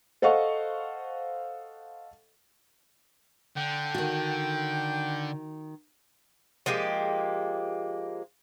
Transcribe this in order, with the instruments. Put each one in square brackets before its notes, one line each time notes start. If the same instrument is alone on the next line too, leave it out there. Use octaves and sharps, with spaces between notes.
[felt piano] A4 C5 D#5 F5 F#5 C#6
[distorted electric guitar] D3 [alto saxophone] G5
[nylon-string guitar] D#3 F#4
[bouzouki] F3 G#3 A#3 G4